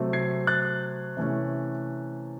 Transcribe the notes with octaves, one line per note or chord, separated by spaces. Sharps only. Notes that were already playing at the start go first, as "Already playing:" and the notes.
Already playing: C3 F#3 A3 C4
G#6 C7
F#6 A6
C3 E3 A3 C#4